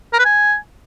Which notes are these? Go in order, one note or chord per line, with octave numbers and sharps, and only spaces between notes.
A#4
B4
G#5